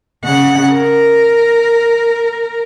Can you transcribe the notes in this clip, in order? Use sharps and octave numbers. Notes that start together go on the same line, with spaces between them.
C#3 F#5
A#4